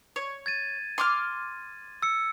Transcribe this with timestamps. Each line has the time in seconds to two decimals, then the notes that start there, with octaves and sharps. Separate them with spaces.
0.16 C#5
0.46 G#6 A6 D#7
0.98 C6 D6 F6
2.02 E6 C#7